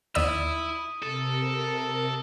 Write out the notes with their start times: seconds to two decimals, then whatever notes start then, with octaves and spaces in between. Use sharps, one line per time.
0.15 D#2 E4 D5 D#6 E6 B6 D#7
1.02 C3 A4 A#4